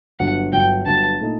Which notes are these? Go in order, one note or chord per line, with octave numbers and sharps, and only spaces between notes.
G1 G2 F#3 F#5
G1 G2 F#3 G5
G1 G2 F#3 A5
A#2 A3 D#4